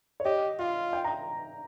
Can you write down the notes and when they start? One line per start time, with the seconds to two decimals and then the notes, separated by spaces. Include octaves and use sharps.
0.20 C#5
0.25 G4 D#5
0.59 F4 F5
0.93 G5
1.04 A#5